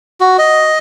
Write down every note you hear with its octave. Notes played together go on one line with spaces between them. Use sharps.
F#4
D#5